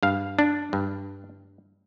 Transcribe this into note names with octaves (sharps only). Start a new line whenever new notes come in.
G2 F5
D4
G2